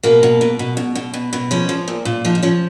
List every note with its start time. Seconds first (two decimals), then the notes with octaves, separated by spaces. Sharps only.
0.03 B2 A#3
0.23 B2
0.41 B2
0.59 B2
0.77 B2
0.95 B2
1.14 B2
1.33 B2
1.51 F3 C#4
1.69 F3
1.88 A#2
2.05 A#2
2.25 F3 D#4
2.35 D#4
2.42 F3 C#4